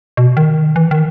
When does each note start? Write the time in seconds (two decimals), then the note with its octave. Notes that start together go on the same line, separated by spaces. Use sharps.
0.17 B2
0.37 D#3
0.76 E3
0.91 D#3